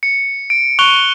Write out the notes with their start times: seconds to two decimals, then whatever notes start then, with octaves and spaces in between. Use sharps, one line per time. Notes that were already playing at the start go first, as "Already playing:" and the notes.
0.03 C#7
0.50 D7
0.79 C#6 F#6 F7 G7